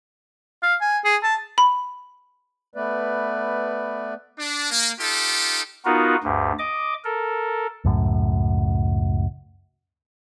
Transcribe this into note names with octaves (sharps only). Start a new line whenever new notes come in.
F5
G#5
G#4
A5
B5
A3 B3 B4 D5
D4
A#3
D#4 F4 G4 A4
B3 D#4 F4 F#4 A#4
D2 G2
D#5 D6
A4 A#4
C#2 F#2 A2